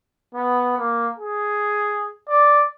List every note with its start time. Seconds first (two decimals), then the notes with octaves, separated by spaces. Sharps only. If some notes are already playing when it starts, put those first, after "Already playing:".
0.35 B3
0.78 A#3
1.19 G#4
2.29 D5